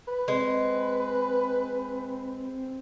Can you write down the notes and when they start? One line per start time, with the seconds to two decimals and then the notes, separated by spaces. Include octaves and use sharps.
0.08 B4
0.28 G#3 C4